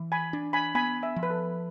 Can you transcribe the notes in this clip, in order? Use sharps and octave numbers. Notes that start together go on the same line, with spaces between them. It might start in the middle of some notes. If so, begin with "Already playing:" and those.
Already playing: E3
G#5 B5
D4
G#5 B5
B3 G#5 B5
E5 G#5
F3
B4
A4